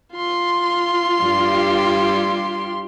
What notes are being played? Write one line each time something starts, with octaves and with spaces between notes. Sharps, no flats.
F4 C6
G2 G3 G4